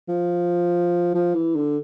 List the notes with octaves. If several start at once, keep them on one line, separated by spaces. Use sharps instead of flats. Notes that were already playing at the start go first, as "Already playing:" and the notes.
F3
F3
E3
D3